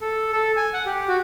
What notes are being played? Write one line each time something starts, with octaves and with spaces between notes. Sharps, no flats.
A4
A4
G#5
F#5
G4
F#4